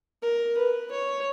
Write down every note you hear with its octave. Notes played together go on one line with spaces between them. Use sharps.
A#4
B4
C#5